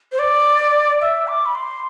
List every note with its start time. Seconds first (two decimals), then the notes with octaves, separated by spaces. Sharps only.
0.12 C5
0.19 D5
1.01 E5
1.28 D6
1.46 B5
1.55 C6